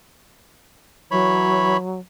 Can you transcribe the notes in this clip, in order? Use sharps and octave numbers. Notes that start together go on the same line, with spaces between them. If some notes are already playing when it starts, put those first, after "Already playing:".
E3 F#3 C#5 B5